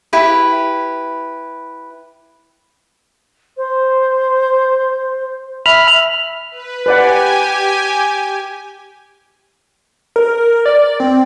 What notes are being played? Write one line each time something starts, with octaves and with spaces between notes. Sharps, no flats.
E4 G4 B4
C5
E5 B5 F6
B4
G4 B4 D5 F#5 G#5
A#4
D5
C4